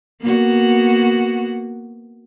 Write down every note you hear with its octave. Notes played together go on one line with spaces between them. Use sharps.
A#3 B3 F#4